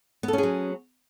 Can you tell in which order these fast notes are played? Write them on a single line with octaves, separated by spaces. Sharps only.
B3 A4 C#4 G#4 F#3